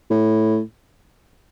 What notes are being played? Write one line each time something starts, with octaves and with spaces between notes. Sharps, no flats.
A2